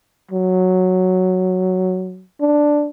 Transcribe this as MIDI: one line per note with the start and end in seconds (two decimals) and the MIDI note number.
0.31 2.24 54
2.41 2.89 62